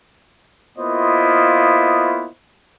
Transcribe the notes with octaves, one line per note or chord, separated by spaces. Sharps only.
A#3 B3 E4 F4 C5 D#5